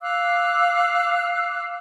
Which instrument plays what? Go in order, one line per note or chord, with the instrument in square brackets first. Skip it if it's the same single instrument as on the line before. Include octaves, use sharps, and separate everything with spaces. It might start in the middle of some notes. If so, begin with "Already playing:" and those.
[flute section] F5 D6 E6 F#6